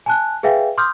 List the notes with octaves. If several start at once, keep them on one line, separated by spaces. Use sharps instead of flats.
G#5 A5 F#6
G#4 B4 E5 F5 G5 G#5
C6 D6 D#6 F6 G6